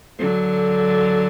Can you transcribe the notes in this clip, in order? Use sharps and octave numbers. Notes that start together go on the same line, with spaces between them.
D3 F#3